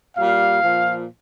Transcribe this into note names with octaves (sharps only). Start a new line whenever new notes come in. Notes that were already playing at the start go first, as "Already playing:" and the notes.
A#2 G3 F5
A#2 F3